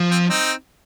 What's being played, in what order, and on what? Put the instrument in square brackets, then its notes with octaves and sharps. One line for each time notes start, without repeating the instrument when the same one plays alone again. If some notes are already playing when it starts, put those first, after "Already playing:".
Already playing: [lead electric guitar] F3
[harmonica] C4
C4 D#4